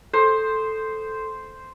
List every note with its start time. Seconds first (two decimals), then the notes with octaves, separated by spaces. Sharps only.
0.13 A4 C5